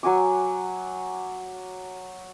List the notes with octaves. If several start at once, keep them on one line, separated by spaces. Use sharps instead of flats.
F#3 F#4 G#5 D6